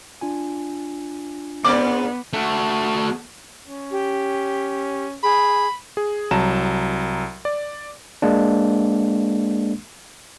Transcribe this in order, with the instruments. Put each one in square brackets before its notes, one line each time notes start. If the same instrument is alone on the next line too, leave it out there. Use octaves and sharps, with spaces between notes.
[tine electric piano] D4 F4 G#5
[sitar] G#2 C4 D5 [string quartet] B3 [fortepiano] D6
[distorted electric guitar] A3 F#4
[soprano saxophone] C#4
[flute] G4
[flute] G#4 [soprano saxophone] B5
[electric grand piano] G#4
C2 F#3 A5 A#5 E7
D5
[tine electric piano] G#3 A#3 D4